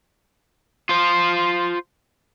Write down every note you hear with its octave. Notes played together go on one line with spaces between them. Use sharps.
F4 C5